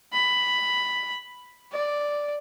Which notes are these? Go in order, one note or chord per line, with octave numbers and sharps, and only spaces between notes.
B5
D5